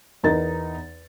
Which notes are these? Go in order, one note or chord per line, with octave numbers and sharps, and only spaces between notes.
E2 D#4 A#4 A6